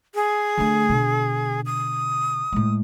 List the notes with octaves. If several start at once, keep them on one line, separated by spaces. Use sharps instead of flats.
G#4
D3 A3
B2 D3
D#6
A2 G#3